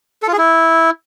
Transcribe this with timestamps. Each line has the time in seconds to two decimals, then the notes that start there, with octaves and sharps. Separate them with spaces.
0.22 A4
0.28 F4
0.33 G#4
0.38 E4